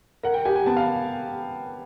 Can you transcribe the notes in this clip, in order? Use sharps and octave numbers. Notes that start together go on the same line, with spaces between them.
A#4 F#5
G5
G4 G#5
G#5
B3 A5
F5